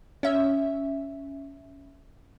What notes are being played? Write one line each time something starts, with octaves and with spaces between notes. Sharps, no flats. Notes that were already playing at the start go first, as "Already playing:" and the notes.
C#4 E5